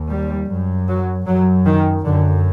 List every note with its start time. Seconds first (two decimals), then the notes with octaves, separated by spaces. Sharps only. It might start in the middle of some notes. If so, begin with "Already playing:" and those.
Already playing: D#2
0.10 G3
0.49 F#2
0.88 F#3
1.27 F#2 F#3
1.66 D#3
2.05 F#2 D3